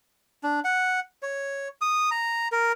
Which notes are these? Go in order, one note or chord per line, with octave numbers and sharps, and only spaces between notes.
D4
F#5
C#5
D#6
A#5
A#4